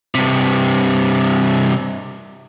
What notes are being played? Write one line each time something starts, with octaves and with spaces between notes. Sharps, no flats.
G2 C3